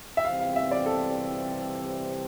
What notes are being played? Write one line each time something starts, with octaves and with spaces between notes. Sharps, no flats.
E5
C3 E3 G3 C4 F5
F5
E5
D5
A4